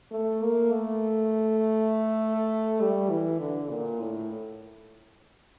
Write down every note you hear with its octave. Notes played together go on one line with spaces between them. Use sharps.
A3
A#3
A3
G3
E3
D3
A#2
A2